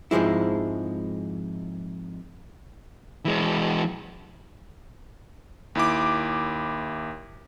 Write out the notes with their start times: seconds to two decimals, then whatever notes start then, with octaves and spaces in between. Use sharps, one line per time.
0.11 F2 G#2 F3 G#3 E4
3.25 E3 G#3
5.75 D#2 E4 D6